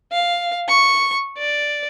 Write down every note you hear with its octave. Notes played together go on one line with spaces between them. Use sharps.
F5
C#6
D5